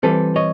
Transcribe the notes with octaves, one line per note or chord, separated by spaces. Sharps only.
E3 G3 C4 A4 B4
C#5 D#5